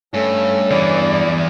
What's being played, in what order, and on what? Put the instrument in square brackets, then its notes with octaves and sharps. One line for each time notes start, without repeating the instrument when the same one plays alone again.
[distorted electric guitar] G2 [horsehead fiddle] A3 [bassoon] C#4
[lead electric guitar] E2 E3 [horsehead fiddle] D5